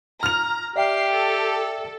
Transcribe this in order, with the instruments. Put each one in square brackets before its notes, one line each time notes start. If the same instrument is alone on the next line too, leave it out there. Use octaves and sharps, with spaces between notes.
[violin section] A#5 [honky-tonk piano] F6 F7
[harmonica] G4 [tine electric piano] D5 E5 G5 [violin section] C7
[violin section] A4